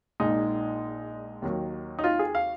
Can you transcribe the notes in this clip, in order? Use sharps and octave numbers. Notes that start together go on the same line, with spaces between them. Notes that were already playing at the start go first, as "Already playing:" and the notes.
A#1 A#2 G#3 D#4
D#2 D#3 F#3
D#4
F4
G#4
F5